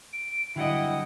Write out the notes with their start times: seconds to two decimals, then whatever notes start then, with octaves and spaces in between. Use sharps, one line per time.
0.13 D7
0.56 D3 F#3 G3 E4 D#5 F#5 G5